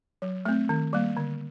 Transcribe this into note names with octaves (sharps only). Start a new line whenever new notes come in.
F#3
A3 C4
D#3
G3 A#3
D3